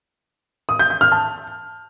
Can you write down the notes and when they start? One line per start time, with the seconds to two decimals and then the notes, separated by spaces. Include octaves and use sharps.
0.69 D#6
0.79 G6
0.90 G6
1.01 F6
1.12 A5